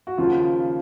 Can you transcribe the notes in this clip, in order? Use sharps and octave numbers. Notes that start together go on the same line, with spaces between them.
F#4
D#2 C#3 F3 F4